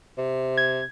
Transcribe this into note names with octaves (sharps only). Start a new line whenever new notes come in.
C3
G#6